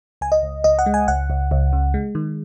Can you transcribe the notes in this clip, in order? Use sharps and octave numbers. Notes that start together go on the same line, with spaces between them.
C#2 G#5
D#5
C#2
C#2 D#5
F#5
G#3
G#5
C#2 F#5
C#2
C#2
C#3
G#3
D#3